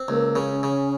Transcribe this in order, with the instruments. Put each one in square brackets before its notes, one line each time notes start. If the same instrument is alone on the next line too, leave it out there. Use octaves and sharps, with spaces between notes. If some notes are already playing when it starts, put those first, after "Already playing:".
Already playing: [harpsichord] C4
[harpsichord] C#2 [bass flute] A#3
[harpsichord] C#3
[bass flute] C#4
[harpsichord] C#3